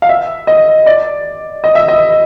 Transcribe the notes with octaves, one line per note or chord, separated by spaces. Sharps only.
F5
E5
D#5
D5
D#5
E5
D#5